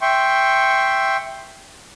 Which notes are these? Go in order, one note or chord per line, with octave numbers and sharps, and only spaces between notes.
E5 G5 C6 C#6